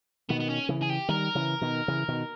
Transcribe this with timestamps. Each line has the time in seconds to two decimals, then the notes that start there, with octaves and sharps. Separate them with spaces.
0.29 B2 D#3 B3
0.40 B3
0.49 C#4
0.69 C#3 E3
0.82 G#4
0.90 G4
1.09 D#3 G3 A#4
1.35 C#3 E3
1.62 B2 D#3
1.88 C#3 E3
2.08 B2 D#3